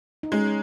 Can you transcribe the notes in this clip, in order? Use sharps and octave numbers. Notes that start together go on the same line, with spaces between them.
D#4
G#3 C#4